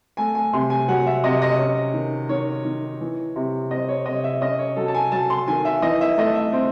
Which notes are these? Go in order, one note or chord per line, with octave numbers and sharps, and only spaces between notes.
A3 G#5
G#5
C3 C6
G#5
F#3 F#5
E5
C3 D#5
D#5
C#4
D#3
D#3 C#5
D#3
E3
C3
C4 D#5
C#5
C3 D#5
E5
C#4 D#5
C#5
F#3 A4
A5
G#5
F#3 A5
C6
D#3 G#5
E5
E3 D#5
E5
A3 D#5
E5
C4